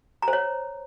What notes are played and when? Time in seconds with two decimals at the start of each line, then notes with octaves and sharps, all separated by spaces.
0.22 A#5
0.28 C5
0.33 C#5